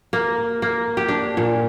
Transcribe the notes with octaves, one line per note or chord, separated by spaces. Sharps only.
A#3
A#3
G4
D4
A#2